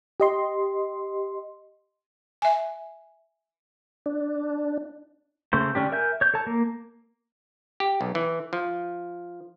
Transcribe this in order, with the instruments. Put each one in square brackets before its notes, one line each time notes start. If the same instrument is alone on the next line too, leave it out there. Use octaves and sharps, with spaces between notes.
[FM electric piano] G4 D#5 C6
[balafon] E5 G#5
[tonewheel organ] D4
[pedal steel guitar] C#3 A3 C5
D3 C#4 D4 G4
A#4 E5 G#5 G6
C#5 G6
A4 C#5 A5
A#3
[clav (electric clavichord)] G4
B1
E3
F3